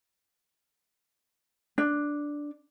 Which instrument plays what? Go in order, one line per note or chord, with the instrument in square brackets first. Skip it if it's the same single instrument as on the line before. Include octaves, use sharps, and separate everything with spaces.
[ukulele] D4